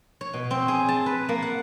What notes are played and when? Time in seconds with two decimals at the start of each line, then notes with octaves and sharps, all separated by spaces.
0.21 C#5
0.34 B2
0.51 C4
0.68 G#4
0.89 A5
1.06 B4
1.29 A#3
1.43 F#5